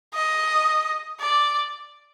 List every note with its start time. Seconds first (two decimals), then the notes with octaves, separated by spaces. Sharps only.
0.14 D#5
1.20 D5